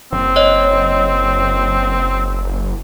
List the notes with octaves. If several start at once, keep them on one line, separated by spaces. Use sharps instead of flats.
F#1 C4
C#5 D#5